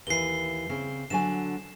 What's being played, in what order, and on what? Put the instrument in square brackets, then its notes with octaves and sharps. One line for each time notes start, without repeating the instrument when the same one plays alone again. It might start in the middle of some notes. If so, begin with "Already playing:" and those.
[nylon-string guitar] D#2 E3 [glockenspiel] C7 G7
[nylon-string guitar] C#3 C4
[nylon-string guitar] D3 F#3 G#5 [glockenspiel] E7